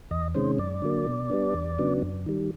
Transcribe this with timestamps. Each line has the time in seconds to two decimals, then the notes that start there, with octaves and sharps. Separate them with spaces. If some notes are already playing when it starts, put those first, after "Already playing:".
0.11 E2 D#5
0.35 C3 D#3 G#3 C#4 C5
0.58 F#2 D5
0.82 D3 F#3 A#3
1.07 B2
1.30 G3 B3 D4
1.54 E2
1.79 C#3 F#3 B3 D4
2.02 F#2
2.26 D#3 G3